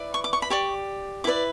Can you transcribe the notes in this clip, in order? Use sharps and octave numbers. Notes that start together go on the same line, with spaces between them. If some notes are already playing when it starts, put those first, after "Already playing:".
Already playing: E4 B4 D5
C#6
D6
C#6
B5
G4 D5 C#6
E4 B4 D5 D6